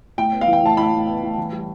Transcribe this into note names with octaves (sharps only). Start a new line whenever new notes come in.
A2 G5
B3
F5
E3
G5
A2 A5
A2 B5
A2
B3
A2
E3
G3